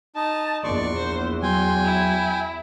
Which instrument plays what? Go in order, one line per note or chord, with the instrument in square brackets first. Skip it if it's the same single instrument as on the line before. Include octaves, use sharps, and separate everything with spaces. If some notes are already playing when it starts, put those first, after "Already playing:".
[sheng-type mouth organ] D#4 D#5 [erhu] A5
[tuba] A#1 [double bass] E2 [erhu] D5 [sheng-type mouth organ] C6 C#6
[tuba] A#1 [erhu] C5
[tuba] F#3 [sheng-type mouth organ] G5 G#5 [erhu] C6
[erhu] E4